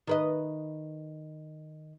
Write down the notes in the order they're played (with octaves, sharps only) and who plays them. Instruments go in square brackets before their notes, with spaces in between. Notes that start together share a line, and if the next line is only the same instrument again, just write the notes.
[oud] D#3 B4 D#5